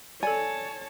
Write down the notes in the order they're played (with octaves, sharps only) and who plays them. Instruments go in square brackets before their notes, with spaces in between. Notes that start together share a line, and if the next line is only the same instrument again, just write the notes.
[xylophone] A4 D5 [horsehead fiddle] C#5 A5 [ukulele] G#5